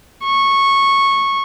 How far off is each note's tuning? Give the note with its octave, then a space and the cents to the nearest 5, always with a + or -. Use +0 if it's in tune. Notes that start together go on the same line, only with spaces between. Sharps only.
C#6 -10